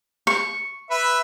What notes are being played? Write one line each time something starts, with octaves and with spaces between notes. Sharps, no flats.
C#6
B4 E5